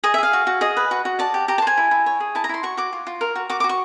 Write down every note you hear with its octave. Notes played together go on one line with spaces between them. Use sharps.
G#4 D#5
E5
G#4 F5
F#4
F#4
G#4 D#5
B4
F#4
F#4
D5 A5
G4
G4 A#5
A5
C5 G#5
E4
E4
C#5
G#4
E4 A5
A#5
E4 C6
F#4 C#6
F#4 D6
F4
F4
A#4
F#4
F#4 D6
D6
F#4
C#6